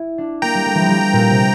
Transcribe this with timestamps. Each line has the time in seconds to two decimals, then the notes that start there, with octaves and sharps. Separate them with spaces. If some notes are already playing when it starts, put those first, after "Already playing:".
Already playing: E4
0.18 D4
0.42 A#3 G5 A#5
0.55 G3
0.66 A3
0.75 E3
0.81 F3
0.89 G3
1.13 A#2
1.31 C3